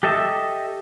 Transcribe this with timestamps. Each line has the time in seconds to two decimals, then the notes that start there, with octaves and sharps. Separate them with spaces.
0.03 G4 A4 D#5 E5